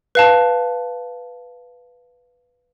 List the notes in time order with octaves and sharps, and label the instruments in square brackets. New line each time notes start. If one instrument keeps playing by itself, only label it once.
[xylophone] B4 F5 A5